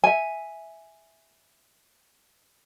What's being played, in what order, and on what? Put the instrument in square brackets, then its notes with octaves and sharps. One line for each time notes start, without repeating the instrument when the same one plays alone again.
[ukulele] E5 G#5